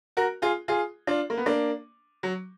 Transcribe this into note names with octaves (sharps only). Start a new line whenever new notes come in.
F#4 A#4
F4 G#4
F4 G#4
D4 F4
A#3
B3
A#3 D4
F#3